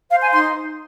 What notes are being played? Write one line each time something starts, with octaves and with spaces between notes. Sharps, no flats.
C5 F5
G#5
D#4 C6